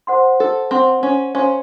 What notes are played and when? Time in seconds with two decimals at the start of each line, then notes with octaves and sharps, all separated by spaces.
0.07 C5 F#5 C6
0.40 A4
0.71 C4 C5 F#5 C6
1.03 C#4
1.35 C#4 C5 F5 C6